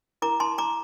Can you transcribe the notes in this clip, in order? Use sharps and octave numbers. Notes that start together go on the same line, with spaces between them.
E4 A#4 A#5 D6
A5 C6
A#5 D6